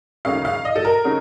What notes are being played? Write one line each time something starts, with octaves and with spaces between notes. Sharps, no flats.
D#2 C#3 F#3 A3 D#4 F5
F5
D#5
A4
A#4
C#3 F#3 A3 D#4